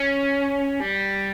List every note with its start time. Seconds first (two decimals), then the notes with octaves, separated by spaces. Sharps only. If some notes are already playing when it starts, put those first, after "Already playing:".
Already playing: C#4
0.80 G3